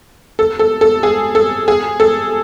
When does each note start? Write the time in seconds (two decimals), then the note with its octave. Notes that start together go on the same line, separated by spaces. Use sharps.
0.39 A4
0.59 A4
0.81 A4
1.03 G#4
1.35 A4
1.68 G#4
2.00 A4